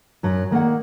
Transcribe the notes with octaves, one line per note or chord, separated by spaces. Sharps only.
F#2 F#3
D#3 A#3 D5 F#5